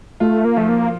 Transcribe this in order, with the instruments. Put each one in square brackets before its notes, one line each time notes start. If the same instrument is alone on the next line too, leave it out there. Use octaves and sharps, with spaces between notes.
[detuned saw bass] A3 [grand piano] F4
[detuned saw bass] A#3
[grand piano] F3 [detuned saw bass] A3
[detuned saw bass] A#3